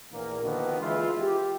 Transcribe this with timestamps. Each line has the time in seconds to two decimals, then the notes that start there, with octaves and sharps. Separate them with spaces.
0.12 A#1 E2 A#2 A#3
0.42 D3 D#3 F3 A#3 B3 F#4
0.80 E3 G#3 E4 F4
1.20 G4